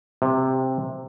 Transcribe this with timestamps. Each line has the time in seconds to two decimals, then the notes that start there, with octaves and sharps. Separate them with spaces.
0.22 C3